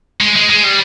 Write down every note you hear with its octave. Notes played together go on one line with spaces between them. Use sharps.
G#3
G#3
G#3
G3